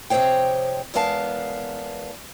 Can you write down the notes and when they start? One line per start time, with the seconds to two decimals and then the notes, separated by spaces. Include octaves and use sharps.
0.10 F2 C3 G#4 C5 C#5 G5
0.94 E2 G#3 B3 A#4 F5 A5